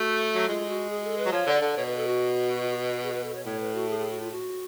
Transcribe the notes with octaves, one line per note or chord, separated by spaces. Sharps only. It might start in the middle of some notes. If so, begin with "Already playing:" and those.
Already playing: A3 F#4
F#3
G#3 F4
F#4
G#4
A4
B4
F#3
F3 C#5
D3
D5
D3
B2 C#5
B4
A4
F#4
G#4
B4
A4
C#5
A2 C#5
B4
F#4
G#4
G#4
F#4
F4
F#4